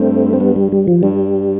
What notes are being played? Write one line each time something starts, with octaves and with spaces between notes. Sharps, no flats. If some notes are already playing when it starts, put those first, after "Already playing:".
Already playing: G2 A3 C4
C4
G3 B3
G3
G3
F3
G2 G3